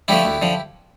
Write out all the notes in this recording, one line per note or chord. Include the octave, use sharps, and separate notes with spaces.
D3 F3 A3 E4 G4
D2
D3 F3